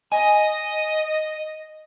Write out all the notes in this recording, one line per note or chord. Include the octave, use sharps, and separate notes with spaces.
D#5 G#5